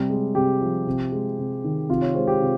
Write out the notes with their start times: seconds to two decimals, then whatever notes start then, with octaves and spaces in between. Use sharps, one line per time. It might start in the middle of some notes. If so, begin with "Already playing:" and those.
Already playing: C3 G3
0.10 G#3
0.35 C3 G4
0.61 F3
0.87 C3
1.12 G#3
1.38 C3
1.64 D#3
1.89 C3 F4
2.02 C#5
2.15 G#3 C5
2.27 G4
2.41 C3 F4